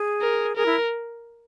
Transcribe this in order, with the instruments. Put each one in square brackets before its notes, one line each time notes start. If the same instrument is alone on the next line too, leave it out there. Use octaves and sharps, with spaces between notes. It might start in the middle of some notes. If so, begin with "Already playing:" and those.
Already playing: [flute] G#4
[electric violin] A#4
[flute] G#4 [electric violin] A#4
[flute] E4